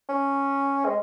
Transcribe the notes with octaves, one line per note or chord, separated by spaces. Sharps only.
C#4
G#3